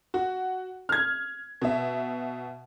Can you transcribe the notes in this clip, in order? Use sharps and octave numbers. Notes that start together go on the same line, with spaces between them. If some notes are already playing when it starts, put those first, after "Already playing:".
F#4
F6 G#6
B2 E5